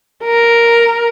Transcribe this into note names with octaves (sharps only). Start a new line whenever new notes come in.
A#4